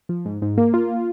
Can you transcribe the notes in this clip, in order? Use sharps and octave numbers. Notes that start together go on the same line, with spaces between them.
F3
G#2
G#2
A#3
F4